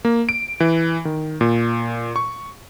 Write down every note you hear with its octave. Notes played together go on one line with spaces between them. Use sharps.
A#3
D7
E3
D#3
A#2
C#6